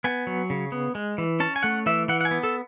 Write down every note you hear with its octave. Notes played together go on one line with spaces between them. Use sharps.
B3 G#5
F#3
C#3
B3
G#3
E3
C#4 A5
G#5
A3 F#5
E3 E5
E3 F#5
F#5
G#5
B3
A4